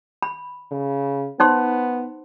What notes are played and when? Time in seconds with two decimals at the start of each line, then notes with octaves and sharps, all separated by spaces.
0.22 B5
0.72 C#3
1.40 B3 D#4 C5 C6